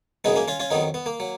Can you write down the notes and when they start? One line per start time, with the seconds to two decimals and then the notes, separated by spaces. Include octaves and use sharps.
0.24 F#2 C#3 G#3 B3 D#4
0.36 A#3 C#4
0.48 C#4 F4
0.60 C#4 F4
0.71 F2 D#3 F#3 B3 D#4
0.94 B3
1.06 A#3
1.20 F#3